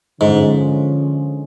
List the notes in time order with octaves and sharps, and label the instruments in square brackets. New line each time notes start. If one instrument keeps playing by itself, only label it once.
[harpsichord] G#2 [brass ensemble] D3 F3 G#3 C#4